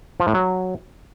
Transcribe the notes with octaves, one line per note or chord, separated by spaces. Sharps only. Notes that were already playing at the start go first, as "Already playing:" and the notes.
F3
A2
F#3